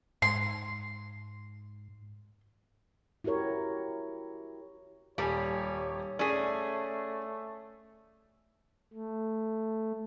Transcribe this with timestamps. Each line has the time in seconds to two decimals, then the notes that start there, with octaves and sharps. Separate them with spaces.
0.22 G#2 C6
3.24 E4 F#4 G4 A#4 C#5
5.18 D#1 G3 G4 C#5 G#5
6.19 A3 C#4 G#4 D5 B6
8.93 A3